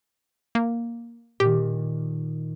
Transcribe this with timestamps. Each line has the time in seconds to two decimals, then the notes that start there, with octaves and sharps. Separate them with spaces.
0.55 A#3
1.40 A#2 D#3 G4